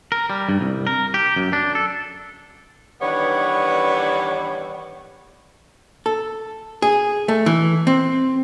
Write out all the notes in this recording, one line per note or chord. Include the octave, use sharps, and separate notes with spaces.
A#4
G3
G2
C2
A#4
G4
F#2
D4
A4
D#3 E3 G3 B3 D4 C#5
A4
G#4
A3
E3
C4